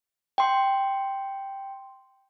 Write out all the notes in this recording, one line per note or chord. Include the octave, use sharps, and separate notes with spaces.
G5 C6